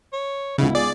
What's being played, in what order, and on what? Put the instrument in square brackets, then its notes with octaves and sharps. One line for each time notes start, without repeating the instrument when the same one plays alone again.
[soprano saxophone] C#5
[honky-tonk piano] C#2 B3 D#4 [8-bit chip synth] C#3 [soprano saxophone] E4
[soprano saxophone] G#4 [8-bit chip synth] D5